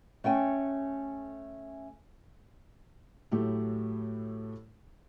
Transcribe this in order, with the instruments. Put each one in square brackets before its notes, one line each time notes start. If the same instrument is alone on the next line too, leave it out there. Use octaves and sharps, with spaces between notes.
[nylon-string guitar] A3 C#4 G5 G#5
[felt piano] A2 F#3 A3 E4 G4